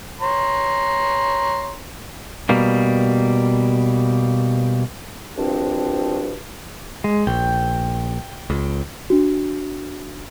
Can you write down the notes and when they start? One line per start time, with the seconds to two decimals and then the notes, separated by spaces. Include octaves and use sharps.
0.21 C#5 A#5 C6
2.49 B2 G3 A#3
5.36 C2 B2 F3 C4 D4
7.04 G#3
7.27 A#1 G5
8.50 C#2
9.10 D4 F#4